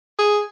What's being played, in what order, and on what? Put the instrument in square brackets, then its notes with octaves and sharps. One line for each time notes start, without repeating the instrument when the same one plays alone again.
[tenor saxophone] G#4